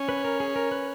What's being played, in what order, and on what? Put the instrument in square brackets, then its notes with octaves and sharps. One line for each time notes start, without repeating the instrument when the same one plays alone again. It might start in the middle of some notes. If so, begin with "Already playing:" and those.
Already playing: [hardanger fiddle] C#4
[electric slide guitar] B4
A#4
G#4
A#4
B4